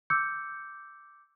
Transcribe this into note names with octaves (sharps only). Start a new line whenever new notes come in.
D6 E6 G6 C#7